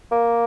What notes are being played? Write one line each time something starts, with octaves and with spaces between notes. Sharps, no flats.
A#3